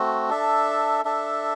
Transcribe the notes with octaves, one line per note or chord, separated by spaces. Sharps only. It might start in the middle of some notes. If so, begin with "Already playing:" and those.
Already playing: A3 C4 F#4
D4 A4 E5
D4 A4 E5